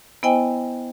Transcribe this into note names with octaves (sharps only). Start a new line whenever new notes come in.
B3 E4 C5 D#5 G5 G#5